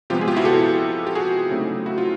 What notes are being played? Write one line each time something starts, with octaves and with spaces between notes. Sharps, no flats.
C3 F3 G#3 B3 F4 G4
G#4
F4 G4
E4 F#4
G4 A4
G4
F#4 G#4
C#3 F#3 A3 C4 D#4
E4 F#4
F4